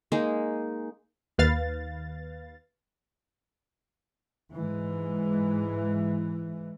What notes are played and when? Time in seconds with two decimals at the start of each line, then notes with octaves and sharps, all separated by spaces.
0.12 G#3 A#3 D#4 G#4
1.38 D#2 B4 F5 A6
4.54 G#2 E3 G#3